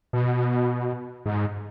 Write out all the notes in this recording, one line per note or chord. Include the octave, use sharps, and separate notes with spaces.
B2
G#2